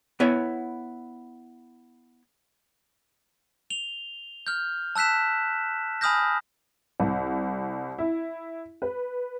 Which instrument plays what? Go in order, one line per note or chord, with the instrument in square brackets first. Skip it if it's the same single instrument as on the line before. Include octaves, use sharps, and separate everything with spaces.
[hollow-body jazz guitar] B3 E4 C#5 F#5 G#5
[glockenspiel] F7 G7
F6 G6
A5 E6 F#6 B6 E7
G#5 B5 D#6 F6 G6 A#6
[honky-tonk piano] C2
E4
B4